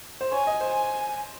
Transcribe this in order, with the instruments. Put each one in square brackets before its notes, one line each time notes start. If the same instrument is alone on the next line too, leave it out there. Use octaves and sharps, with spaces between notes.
[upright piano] C5
[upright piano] C#5 [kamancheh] G#5
[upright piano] D#5
C5
[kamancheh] G#5